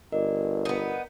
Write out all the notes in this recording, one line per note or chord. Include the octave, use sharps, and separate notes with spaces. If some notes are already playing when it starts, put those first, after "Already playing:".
G1 A#4 D5 D#5
B3 D#4